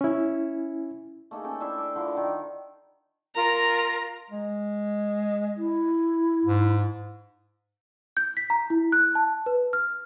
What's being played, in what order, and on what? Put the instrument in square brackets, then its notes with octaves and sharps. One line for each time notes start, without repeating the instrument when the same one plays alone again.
[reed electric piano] C#4 E4
[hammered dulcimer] A3 A#3 D#4 G#4
C#4 A4 G5
D4 E4 C5 E5
D6
D3 E4 F4 A#4
D#3 F#5
[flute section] F4 A#4 [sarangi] A#5
[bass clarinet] G#3
[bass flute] E4
[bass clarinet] G#2
[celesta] G6
B6
A#5
E4
F#6
A5
B4
F6